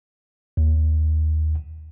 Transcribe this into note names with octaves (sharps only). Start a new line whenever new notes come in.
D#2